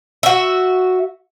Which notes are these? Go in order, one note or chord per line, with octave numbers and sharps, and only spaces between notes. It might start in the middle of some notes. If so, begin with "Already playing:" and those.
F#4 E5